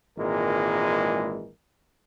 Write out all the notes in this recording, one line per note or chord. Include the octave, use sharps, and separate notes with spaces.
G#1 A#2 E3 G#3 A#4